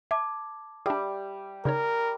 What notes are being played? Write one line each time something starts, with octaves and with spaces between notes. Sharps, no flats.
E5 A5 D6 G#6
G3 D4 G#4 E5
C#3 D#4 A#4 C#5 D5